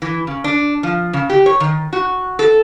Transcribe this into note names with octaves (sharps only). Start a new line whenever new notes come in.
E3
C#3
D4
F3
C#3
G4
C#5
D#3
F#4
A4